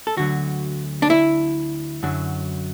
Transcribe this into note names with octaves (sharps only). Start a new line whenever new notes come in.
A4
D2 D3 F#3 F#4
D4
E4
F#2 D3 F#3